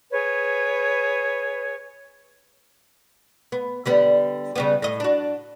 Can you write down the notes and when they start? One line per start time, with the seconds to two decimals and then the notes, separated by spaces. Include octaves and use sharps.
0.12 G#4 B4 C#5
3.52 B3
3.86 D3 G3 B3
4.56 C#3 G3 B3
4.82 A2 D#5
5.00 D4 F#4